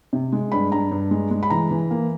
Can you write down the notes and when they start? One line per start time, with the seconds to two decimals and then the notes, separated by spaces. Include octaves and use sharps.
0.13 C3
0.32 G#3
0.52 G2 B5
0.72 G2 A#5
0.91 G2
1.11 G#3
1.31 G#3
1.43 B5
1.50 E3 A#5
1.71 E3
1.91 A#3